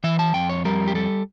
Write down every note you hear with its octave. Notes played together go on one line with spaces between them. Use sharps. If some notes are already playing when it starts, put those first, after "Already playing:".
E3 E5
A5
F2 G5
C#5
G3 A#4
G4
G3 A4